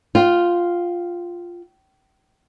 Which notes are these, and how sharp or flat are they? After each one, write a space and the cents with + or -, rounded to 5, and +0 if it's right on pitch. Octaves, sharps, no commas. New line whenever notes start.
F4 +0 G5 -30